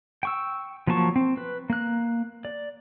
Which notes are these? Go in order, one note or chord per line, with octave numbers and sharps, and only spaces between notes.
G5 C#6 E6
F3 F#3 A#3 A5 C#6
C4
B4
A#3 F#6
D5